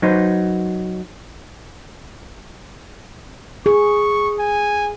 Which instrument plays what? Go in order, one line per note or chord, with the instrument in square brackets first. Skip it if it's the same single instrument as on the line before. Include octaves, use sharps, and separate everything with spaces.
[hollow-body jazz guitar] F#3 D#4 B4 C5
[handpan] G#4 [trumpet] C#6
[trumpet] G#5